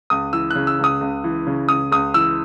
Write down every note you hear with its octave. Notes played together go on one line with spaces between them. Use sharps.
C#2 D#6
E3 E6
C#3 F#6
E6
C#2 D#6
C#2
E3
C#3
C#2 D#6
C#2 D#6
E3 E6